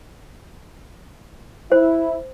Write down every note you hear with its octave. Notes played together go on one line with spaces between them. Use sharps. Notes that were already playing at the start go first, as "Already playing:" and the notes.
E4 C5